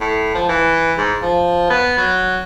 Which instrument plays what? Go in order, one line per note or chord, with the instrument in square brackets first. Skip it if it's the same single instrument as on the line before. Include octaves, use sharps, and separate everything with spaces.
[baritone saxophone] A2
F3
E3
G#2
F3
B3
F#3